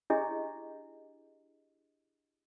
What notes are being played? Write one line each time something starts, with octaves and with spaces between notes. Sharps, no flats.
D4 E4 G4 G#4 D#5